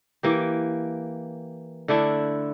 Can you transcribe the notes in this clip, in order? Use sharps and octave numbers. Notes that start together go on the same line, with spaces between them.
E3 A#3 G4
D3 A3 D4 E4